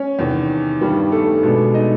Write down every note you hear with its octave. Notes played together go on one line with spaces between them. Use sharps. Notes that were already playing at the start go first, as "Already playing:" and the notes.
Already playing: C#4 C#5
E2 C3 D#3
G2 D#3 G3 B3
A3 A4
B2 G#3 B3 D4
D#4 D#5